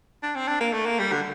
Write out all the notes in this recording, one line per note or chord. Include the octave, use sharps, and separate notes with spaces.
D4
C4
D4
A#3
A3
A#3
G3
D3